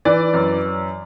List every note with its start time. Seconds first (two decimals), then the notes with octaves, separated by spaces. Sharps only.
0.05 E3 D5
0.34 F#2